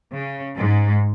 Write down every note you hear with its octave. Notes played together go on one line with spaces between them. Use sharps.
C#3
G#2